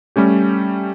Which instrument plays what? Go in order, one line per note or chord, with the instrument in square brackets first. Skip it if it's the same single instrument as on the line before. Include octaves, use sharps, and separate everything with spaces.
[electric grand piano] G3 A3 C#4 G4